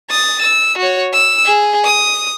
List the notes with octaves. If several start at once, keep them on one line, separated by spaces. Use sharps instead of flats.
D#6 A6
E6
F#4 C#5
E6
G#4
D#6